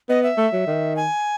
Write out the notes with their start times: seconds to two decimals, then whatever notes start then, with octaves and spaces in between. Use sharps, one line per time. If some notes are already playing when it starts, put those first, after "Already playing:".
0.09 B3 D#5
0.23 E5
0.37 A3
0.53 F#3
0.67 D#3
0.96 G#5